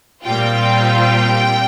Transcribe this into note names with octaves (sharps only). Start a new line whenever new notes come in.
A#2 G3 C4 F4 G5